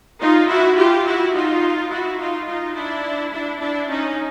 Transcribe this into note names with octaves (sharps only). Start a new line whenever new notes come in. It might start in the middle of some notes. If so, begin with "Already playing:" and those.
D#4 F4
E4 F#4
F4 G4
E4 F#4
D#4 F4
E4 F#4
D#4 F4
D#4 F4
D4 E4
D4 E4
D4 E4
C#4 D#4